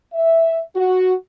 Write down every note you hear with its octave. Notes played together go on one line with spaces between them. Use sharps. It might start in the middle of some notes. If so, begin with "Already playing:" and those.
E5
F#4